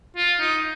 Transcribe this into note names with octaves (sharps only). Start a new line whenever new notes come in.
F4
D#4